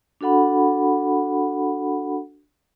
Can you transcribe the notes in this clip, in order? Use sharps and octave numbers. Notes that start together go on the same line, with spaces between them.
D4 F#4 A4 F#5 B5